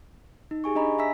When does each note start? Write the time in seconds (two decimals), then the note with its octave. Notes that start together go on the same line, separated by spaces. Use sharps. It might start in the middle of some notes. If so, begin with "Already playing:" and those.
0.51 D#4
0.64 G4 G#4 G#5 C#6
0.75 D4 D#5 A#5 B5
0.99 E5 G#5 A#5 C6 E6 B6